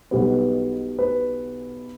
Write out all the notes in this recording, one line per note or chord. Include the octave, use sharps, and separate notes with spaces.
B1 B2 G3 B3 B4
B4